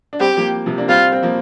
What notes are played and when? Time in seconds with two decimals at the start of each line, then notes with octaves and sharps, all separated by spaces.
0.13 D4
0.20 G3 C4 G4
0.37 F3 A#3
0.66 C3 F3
0.78 A#3 D4
0.88 G3 C4 F4
1.12 C4
1.23 F3 A#3